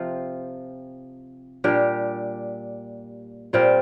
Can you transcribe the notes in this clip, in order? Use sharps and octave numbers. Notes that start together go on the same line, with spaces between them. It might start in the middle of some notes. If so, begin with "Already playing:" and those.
Already playing: C3 F3 C4 F4
A#2 G3 D4 G4
A#2 G3 C4 F4